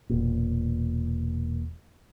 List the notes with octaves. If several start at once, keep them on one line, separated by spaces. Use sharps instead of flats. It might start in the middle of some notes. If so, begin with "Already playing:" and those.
E1 A#2